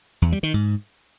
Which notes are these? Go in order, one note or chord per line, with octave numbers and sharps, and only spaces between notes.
E2
G3
D#3
G#2